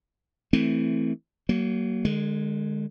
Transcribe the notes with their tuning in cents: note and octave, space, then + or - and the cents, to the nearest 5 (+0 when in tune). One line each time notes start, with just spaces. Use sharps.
E3 -10 A3 +0 C4 +0
F#3 +30 A#3 +0
D3 +45 G#3 +0